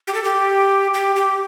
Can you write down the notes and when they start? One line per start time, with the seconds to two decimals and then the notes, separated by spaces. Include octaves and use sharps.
0.07 G4
0.14 A4
0.24 G4
0.94 G4
1.16 G4